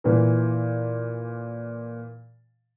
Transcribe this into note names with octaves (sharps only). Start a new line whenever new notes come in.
A#2 E3